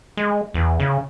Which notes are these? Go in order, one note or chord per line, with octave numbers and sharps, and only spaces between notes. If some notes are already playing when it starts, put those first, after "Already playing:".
G#3
E2
C#3